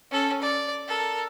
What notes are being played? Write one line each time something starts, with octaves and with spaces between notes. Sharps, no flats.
C#4 A4
D5
A4 A#4